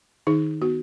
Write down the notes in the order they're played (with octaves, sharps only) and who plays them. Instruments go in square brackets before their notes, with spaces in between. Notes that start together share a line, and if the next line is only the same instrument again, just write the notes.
[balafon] D#3 D#4 G#4
B3 F#4